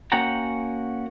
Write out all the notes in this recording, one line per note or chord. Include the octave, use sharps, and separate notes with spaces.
A#3 C#4 F#4 F#5 G5 A#5